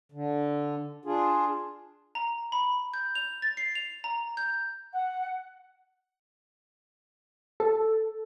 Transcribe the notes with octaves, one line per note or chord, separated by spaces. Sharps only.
D3
D4 F4 G#4
A#5
B5
G6
F7
A6
C7
F7
A#5
G6
F#5
A4